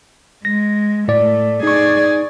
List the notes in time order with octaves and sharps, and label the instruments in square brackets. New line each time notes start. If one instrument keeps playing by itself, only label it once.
[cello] G#3 [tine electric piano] A#6
[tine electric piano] A2 D5 [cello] A3
[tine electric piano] D#4 C#6 [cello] G#4 D5